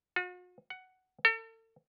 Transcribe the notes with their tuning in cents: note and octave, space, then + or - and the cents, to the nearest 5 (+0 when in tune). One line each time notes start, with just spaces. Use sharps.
F#4 -45
F#5 +10
A4 +40